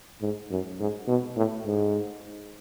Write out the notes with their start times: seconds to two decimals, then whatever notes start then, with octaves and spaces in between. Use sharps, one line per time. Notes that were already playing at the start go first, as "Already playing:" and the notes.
0.22 G#2
0.51 F#2
0.80 G#2
1.08 B2
1.36 A2
1.66 G#2